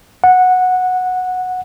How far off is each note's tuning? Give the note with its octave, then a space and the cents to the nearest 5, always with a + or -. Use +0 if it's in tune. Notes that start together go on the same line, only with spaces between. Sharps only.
F#5 -10